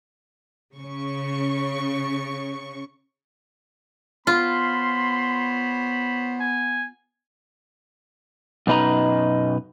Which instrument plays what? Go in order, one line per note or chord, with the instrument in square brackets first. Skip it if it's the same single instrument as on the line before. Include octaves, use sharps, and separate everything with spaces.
[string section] C#3 C#6
[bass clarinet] B3 [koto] F4 [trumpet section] C5 C#5 B5 [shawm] C6
[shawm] G#5
[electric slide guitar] F#2 B2 D#4 B4 D#5 A#5